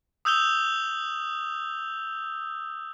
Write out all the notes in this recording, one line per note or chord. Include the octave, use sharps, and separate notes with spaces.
D#6 E6 G6 F7 G7